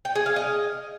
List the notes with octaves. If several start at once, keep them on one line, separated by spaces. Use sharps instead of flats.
G5
G#4
F5
D#5